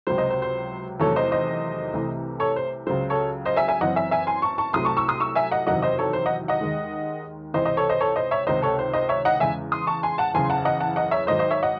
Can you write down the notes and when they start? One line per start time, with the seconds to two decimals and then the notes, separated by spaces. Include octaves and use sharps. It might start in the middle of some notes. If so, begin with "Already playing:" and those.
0.07 C#2 C3 F#3 C5
0.18 C5 D#5
0.30 C5
0.42 C5
1.00 E2 C3 D#3 F#3 A3 A4 C#5
1.16 C5 D#5
1.31 C5 D#5
1.94 C2 C3 E3 A3
2.40 A4 C#5
2.56 C5
2.87 C#2 C#3 F#3 C5
3.10 A4 C#5
3.45 C5 D#5
3.56 E5 G#5
3.68 E5 G#5
3.80 F#1 F#2 E3 C4 D#5 F#5
3.96 E5 G#5
4.11 E5 G#5
4.27 G#5 C6
4.42 A5 C#6
4.58 A5 C#6
4.73 C2 C3 F#3 A3 C6 D#6
4.85 A5 C#6
4.97 C#6 E6
5.08 C6 D#6
5.20 C#6 E6
5.35 E5 G#5
5.51 D#5 F#5
5.67 F#1 E2 C3 D#3 F#3 D#5 F#5
5.82 C5 D#5
5.99 A4 C#5
6.13 C5
6.26 D#5 F#5
6.48 D#5 F#5
6.61 D#2 D#3 G#3
7.54 C#2 C3 E3 C4 C5 D#5
7.65 C5 D#5
7.77 A4 C#5
7.89 C5 D#5
8.00 A4 C#5
8.16 C5 D#5
8.31 C#5 E5
8.47 C#2 C3 D#3 C5 D#5
8.62 A4 C#5
8.79 C5
8.93 C5 D#5
9.09 C#5 E5
9.25 D#5 F#5
9.40 E2 C#3 G#3 E5 G#5
9.72 C6 D#6
9.87 A5 C#6
10.03 G#5 C6
10.18 F#5 A5
10.34 F#1 E2 C#3 E3 G#5 C6
10.50 F#5 A5
10.65 D#5 F#5
10.80 F#5 A5
10.96 D#5 F#5
11.11 C#5 E5
11.27 G#1 G#2 D#3 F#3 C5 D#5
11.39 C5 D#5
11.50 C#5 E5
11.63 D#5 F#5